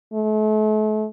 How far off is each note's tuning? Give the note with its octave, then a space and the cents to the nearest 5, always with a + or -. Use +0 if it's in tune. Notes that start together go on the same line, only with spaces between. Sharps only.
A3 -40